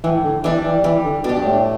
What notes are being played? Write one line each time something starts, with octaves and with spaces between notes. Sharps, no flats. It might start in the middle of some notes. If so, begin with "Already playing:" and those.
A2 E3
D3
E3 G3 D4
E3
E3 G3
D3
B2 D4 G4
G2
A2